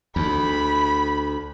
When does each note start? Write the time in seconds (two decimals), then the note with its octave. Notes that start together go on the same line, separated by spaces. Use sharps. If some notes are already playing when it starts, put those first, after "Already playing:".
0.16 D2 B5